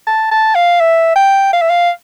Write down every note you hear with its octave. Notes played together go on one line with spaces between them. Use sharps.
A5
A5
F5
E5
G5
F5
E5
F5